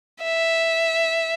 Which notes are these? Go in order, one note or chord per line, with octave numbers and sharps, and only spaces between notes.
E5